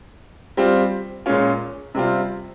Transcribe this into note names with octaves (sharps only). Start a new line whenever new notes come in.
G3 C4 F4
A#2 G#3 C#4 F4
C3 G3 C4 F4